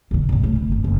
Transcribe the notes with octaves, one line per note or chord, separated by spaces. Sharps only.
B2 D3
B1 G2
C2 A2
D2
G1 F3
F#1